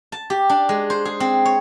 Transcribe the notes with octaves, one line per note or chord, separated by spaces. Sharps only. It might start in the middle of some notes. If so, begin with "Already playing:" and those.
A5
G4
D4
G#3
C5
G#4
C4
C#5